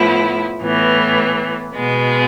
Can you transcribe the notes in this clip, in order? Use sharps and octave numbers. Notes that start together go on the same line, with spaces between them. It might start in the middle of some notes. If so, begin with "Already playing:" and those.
Already playing: A2 F3 B3 E4
A2 E3 B3
B2 G#3 B3